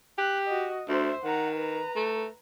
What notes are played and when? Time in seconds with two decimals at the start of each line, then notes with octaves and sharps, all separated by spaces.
0.19 G4 F#6
0.47 F#4 D#5
0.88 D2 C5 E5
1.24 D#3 F#5 A#5
1.55 B4 A#5
1.96 A3